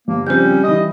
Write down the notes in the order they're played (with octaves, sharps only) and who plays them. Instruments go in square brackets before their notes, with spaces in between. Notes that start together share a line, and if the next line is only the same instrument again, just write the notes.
[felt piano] G1 [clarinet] A#3
[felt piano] C#3 F3 C4 [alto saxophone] G3 [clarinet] C#4 [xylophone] C5 G6
[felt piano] E3 D#6 [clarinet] D#5